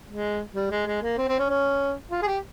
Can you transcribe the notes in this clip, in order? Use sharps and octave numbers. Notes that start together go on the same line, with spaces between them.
G#3
G3
G#3
G#3
A#3
C4
C4
C#4
C#4
F4
G#4
G4